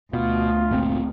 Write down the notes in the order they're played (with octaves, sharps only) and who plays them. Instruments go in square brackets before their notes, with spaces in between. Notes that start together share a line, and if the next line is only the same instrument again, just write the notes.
[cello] D2 [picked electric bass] B2 [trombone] F4
[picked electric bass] G1 A#2 C4